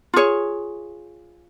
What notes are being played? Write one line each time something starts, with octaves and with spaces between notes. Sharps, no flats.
F4 G#4 C#5